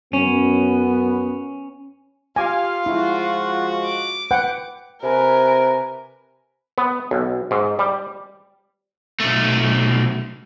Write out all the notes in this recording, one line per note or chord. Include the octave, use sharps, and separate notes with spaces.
F#2 B3 C#4
F4 G4 F5 G#5 D6
F3 G#3 E4 F#4
D6
B4 F#5 G5
C3 A#4 B4 G#5
B3
B1
G#2
G3
B1 A3